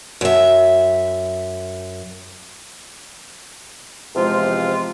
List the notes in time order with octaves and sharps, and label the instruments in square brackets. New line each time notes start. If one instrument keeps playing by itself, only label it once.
[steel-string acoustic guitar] F#2 E5
[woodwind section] E2 C3 F3 G#3 F4 C5